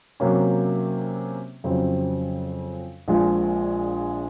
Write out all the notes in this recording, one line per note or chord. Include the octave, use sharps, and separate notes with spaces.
C3 F#3 A#3 C#4
F2 C#3 F#3 C4
A#1 A#2 F3 G#3